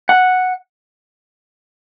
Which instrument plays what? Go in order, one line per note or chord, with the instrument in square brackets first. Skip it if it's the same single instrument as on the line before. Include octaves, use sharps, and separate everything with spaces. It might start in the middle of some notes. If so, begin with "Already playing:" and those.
[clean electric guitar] F#5